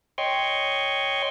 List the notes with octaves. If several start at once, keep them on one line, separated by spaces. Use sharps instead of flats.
C#5 D#5 G5 C6 C#6